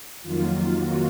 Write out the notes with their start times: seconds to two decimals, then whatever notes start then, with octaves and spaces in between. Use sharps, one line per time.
0.23 F2 D#3 F#3 A#3 F4
0.76 F#4